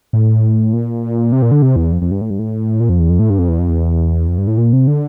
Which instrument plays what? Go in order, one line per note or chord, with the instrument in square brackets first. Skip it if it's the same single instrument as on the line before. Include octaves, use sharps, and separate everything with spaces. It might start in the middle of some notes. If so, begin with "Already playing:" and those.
[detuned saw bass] A2
A#2
C3
A#2
D3
C3
E2
F2
F2
G2
A2
G2
A2
A#2
F2
E2
F2
A2
G2
F2
E2
F2
E2
F2
G2
A2
A#2
C3
D3